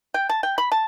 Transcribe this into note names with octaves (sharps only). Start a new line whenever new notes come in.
G5
A5
G5
B5
A5